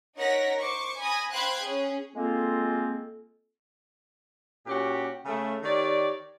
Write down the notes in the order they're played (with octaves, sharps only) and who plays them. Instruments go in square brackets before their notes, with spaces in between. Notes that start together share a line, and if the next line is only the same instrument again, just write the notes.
[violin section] D#4 A#4 C#5 F#5 A#6 B6
C5 C#6 D6
G#5 B5 D#6 A#6
C5 F5 G5 B5 F#6 G#6
C#4 G#4
[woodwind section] G#3 A#3 C4 F4 A4
[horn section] A#2 C#4 F#4 G4
C#3 A3
D#3 G4 C#5 D5